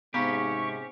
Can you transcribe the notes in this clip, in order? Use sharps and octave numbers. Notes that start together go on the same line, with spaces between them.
G#2 C3 B3 C#4 G4 F5 A#5 C#6